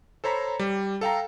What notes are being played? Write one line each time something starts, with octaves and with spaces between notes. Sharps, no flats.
A4 C5 C#5 A#5 B5
G3
A4 F5 G5 A#5